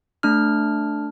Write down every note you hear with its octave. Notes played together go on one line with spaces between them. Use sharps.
A3 D4 F6